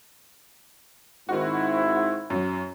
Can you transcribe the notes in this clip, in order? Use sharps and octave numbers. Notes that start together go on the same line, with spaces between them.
G#2 D#3 C4 E4 F#4
F#2 F#3